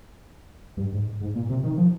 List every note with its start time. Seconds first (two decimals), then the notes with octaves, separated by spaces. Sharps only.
0.77 G2
0.92 G#2
1.20 G#2
1.35 A#2
1.49 C3
1.63 D#3
1.78 F3